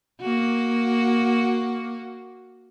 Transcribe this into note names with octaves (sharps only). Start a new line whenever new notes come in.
A#3 F#4